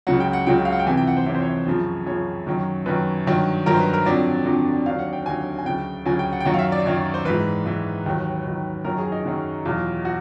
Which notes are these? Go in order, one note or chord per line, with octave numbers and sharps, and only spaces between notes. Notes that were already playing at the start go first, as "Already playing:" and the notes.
C#2 C#3 F#3 F#5
G5
F#5
C#2 C#3 F#3 G5
F5
F#5
G5
F2 C3 E3 G#5
G5
F#5
C5
F2 C3 E3 C#5
C5
C#5
F#2 C#3 F3
F#2 C#3 F3 C#5
F#2 D#3 F#3
F#2 D#3 F#3 B4
G2 D#3 F#3
G2 D#3 F#3 A#4
C5
B4
A#4
F2 D3 F#3 D5
F2 D3 F#3
D#2 D3 F#3 F5
F#5
G5
D#2 D3 F#3 G#5
G#5
D2 C#3 F#3 G5
D2 C#3 F#3 G#5
G5
F#5
G5
F#2 D#3 F#3 F#5
F5
E5
D5
F#2 D#3 F#3 C#5
C5
G#2 E3 B4
G#2 E3
D#2 D#3 F#3
D#2 D#3 F#3
F#2 D#3 F#3 A#4
G#4
D#4
F#2 D#3 F#3
E2 B2 F#3 F4
F#4